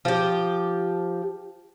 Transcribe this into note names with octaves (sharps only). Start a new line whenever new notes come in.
F3 G4